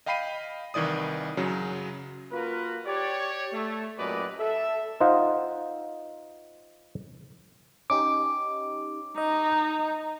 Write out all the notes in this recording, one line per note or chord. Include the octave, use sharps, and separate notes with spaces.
D#5 F5 G5 B5 C7 D#7
C2 D#3 E3 D5 D#6
F#2 C#3 F#3
A#3 F4 F#4 A#4 B4
G4 C#5 D5
A3
F#2 A#2 G4 B4 D5 D#5
A4 E5
D#4 F4 C5 D#5 F5 F#5
C#4 D#4 G4 D6
D#4 D#5